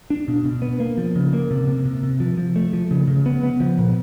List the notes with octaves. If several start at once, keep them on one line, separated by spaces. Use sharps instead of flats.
D4
B2
B2
B3
A#3
F3
C#3
A#3
C3
C3
C3
C3
F3
F3
A3
F3
C#3
C#3
B3
B3
F3
A#2